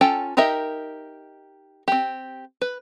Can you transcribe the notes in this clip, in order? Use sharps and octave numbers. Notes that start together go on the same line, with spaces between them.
C#4 F4 A4 G5 A5
D#4 G4 A#4 D#5 E5
C4 G4
B4